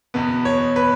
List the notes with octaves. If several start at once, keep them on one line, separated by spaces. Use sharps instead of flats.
E2 B2 B3
C#5
B4